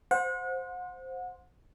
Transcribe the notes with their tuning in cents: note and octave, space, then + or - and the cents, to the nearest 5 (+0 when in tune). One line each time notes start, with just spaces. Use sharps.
C5 +0 F#5 -35